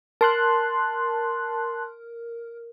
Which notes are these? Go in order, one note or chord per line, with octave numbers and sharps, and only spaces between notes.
A#4 A5 C6 F#6